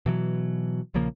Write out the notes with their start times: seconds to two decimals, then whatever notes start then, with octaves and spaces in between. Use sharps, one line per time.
0.06 B2 E3 F#3
0.94 A#1 C#3 F3 A#3